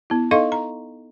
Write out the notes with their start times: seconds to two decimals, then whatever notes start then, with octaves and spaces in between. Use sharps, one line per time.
0.10 B3 E4
0.31 D#4 A4 D#5 F5 C6 C#6
0.52 A#5